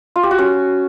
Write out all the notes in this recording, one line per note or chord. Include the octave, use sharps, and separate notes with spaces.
F4
G4
F#4
C#4